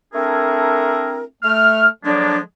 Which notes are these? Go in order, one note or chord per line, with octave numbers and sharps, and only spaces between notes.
A3 C4 D4 E4 G#4 A#4
A3 F6
D3 F3 F#3 G#3 A#3 D4